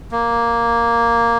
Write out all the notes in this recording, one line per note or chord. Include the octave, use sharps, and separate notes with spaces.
A#3